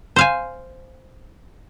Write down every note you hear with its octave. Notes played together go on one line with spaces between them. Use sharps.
C5 F5 G#5